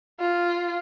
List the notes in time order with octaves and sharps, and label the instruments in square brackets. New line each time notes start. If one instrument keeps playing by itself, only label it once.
[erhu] F4